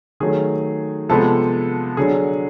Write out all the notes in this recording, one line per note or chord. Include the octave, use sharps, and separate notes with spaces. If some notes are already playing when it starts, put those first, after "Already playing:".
D#3 F#3 A3 G#4
C3 F3 G#3 B3 A4
D3 F#3 G#4